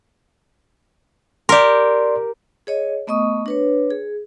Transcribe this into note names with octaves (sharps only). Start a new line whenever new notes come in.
G4 A#4 D5 C6
G#4 C#5 D#5
A3 B3 D#5 C#6 D#6
D4 B4 C#5
G#4